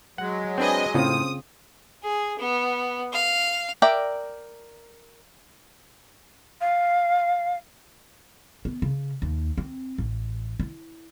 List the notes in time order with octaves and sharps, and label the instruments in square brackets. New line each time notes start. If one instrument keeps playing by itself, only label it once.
[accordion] F#3 G#3 [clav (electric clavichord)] F#5
[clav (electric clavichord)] C4 D4 B4 [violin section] D#5 G#5
[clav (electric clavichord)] A2 [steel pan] C#3 C4 F4 [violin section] D#6
[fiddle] G#4
B3
F5
[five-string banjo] A#4 D5 E5 G5
[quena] F5
[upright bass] B3
C#3
D#2
C4
A1
E4